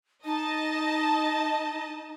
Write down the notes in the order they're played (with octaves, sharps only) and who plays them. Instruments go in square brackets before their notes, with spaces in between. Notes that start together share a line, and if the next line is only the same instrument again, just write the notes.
[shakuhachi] D#4 [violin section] D#5 A5